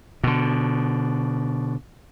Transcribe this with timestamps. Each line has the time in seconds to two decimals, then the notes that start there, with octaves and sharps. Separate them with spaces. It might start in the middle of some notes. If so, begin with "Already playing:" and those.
0.24 B2 D3